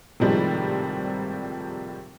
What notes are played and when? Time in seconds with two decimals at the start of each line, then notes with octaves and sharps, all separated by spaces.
0.20 G#1 A2 C3 F3 G3 G#3